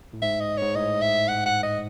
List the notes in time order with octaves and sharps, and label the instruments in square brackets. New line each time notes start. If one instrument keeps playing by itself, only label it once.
[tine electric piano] A2
[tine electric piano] G#2 [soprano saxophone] E5
[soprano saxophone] D#5
[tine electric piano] G#2 [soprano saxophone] C#5
[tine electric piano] A2 [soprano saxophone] D#5
[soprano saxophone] E5
F#5
F#5
D#5